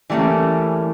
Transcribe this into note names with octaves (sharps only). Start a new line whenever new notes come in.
E3 G3 A3 A#3 C#4